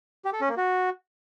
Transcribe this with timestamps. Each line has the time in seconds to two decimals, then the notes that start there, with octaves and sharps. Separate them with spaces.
0.25 G4
0.33 A4
0.41 C#4
0.49 A#3
0.57 F#4